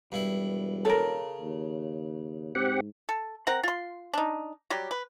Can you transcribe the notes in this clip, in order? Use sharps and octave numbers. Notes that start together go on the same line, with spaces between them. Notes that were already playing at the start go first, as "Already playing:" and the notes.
E1 G2 E4
C#3 A4 A#4
D#2
G#2 C4 G4 F#5
A4
C4 A#4 F#5
F4 C6
D4 D#4
F#3 G3 G4
B4